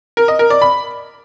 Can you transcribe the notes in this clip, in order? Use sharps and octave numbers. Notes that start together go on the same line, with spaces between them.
A#4
D#5
A#4
D5
B5